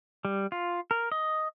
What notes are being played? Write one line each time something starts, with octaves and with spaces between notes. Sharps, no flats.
G3
F4
A#4
D#5